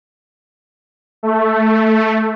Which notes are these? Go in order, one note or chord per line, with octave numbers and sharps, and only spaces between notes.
A3